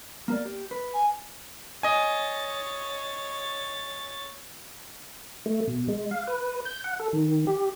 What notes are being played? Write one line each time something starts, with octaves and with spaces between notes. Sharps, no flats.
A#3 A#4 D5
G4
B4
G#5
C#5 D#5 G#5 A6
A3
B2
G#3
F5
B4
G6
F#5
A4
D#3
G4